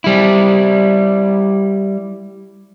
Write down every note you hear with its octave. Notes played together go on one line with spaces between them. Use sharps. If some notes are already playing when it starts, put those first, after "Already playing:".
G3 E4